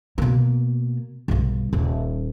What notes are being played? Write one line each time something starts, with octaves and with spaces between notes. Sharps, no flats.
B2 A#3
B1 G2
D#1